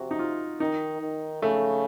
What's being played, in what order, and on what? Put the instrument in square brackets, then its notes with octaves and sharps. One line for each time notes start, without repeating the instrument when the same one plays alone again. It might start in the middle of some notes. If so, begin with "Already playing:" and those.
Already playing: [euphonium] C3 [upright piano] F#4
[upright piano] D#4
F4
[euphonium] D#3 [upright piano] D#4
[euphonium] D#3
[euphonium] C#3 [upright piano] A3